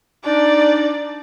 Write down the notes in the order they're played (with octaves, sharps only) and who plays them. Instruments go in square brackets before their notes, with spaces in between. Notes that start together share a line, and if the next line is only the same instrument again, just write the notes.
[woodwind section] D4 D#4 [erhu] D5